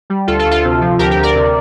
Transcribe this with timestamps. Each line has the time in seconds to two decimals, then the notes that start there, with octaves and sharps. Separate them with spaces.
0.10 G3
0.27 D2 F4 A4
0.39 F4 A4
0.46 D2
0.51 F4 A4
0.64 C3
0.81 F3
0.99 D2 G4 A#4
1.11 G4 A#4
1.17 D2
1.23 A#4 D5
1.35 C3